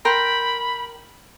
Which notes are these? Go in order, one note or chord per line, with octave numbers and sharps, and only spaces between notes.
A#4 G5 B5 C6